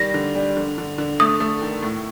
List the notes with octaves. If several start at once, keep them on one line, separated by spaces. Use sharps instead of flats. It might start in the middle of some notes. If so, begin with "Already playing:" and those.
Already playing: D#3 G3 A#6
D3
G3
D3
D3
D3
A3 D#6
A3
D#3
A2